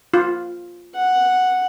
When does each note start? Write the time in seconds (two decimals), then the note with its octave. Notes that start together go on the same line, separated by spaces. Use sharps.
0.14 F4
0.95 F#5